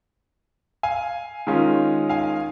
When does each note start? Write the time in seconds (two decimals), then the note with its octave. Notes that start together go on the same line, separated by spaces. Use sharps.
0.83 F5 G#5
1.47 D#3 G#3 C#4 F4
2.09 F5 G#5